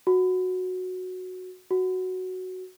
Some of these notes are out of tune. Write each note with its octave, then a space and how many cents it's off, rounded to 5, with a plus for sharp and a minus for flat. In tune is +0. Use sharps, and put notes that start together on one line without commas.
F#4 -10
F#4 +0